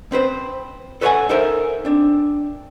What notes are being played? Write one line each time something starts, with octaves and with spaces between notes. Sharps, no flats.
C4 B4 C5
A4 B4 C#5 E5 F#5 G#5
D#4 A4 A#4 C5 E5
C4 D4